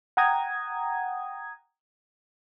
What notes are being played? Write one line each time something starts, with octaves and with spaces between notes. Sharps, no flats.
F#5 G5 A#5 D#6 G#6